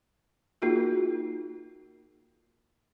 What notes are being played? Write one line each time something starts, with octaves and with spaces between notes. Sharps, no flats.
A#3 D#4 F4 F#4 G#4 A#4